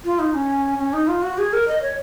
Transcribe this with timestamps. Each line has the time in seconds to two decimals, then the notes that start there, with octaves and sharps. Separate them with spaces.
0.05 F4
0.19 D#4
0.34 C#4
0.78 C#4
0.93 D#4
1.08 F4
1.23 F#4
1.38 G#4
1.53 A#4
1.68 D#5
1.82 C#5